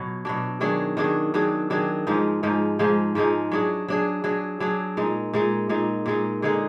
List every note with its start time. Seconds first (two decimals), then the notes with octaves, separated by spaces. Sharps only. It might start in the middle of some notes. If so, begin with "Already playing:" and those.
Already playing: B2 F#3
0.25 B2 F#3 D4
0.60 D#3 F#3 D4 G#4
0.97 D#3 F#3 D4 G#4
1.34 D#3 F#3 D4 G#4
1.70 D#3 F#3 D4 G#4
2.07 G#2 F3 G#3 D#4
2.43 G#2 F3 G#3 D#4
2.79 G#2 F3 G#3 D#4
3.15 G#2 F3 G#3 D#4
3.52 F#3 D4 G#4
3.88 F#3 D4 G#4
4.24 F#3 D4 G#4
4.60 F#3 D4 G#4
4.97 A#2 G#3 D#4
5.33 A#2 G#3 D#4
5.69 A#2 G#3 D#4
6.06 A#2 G#3 D#4
6.42 D3 G#3 D#4 G#4